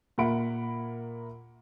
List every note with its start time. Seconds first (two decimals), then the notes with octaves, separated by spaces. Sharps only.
0.18 A#2 A#3 E5 F#5 B5 D7